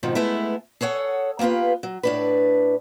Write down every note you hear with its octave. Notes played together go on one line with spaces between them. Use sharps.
F2 G#2 B2 D#3 F3
G#3 A3 B3 E4
G#4 A4 C#5 F#5
A#3 B3 F4 G4 B4
F#3
A2 D4 B4